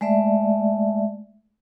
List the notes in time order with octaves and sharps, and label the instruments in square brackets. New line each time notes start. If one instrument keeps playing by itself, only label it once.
[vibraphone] G#3 A3 D5 E5